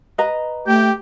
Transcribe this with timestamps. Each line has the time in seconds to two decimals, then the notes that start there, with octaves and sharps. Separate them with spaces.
0.18 B4 D#5 A#5
0.67 A3 G4 G5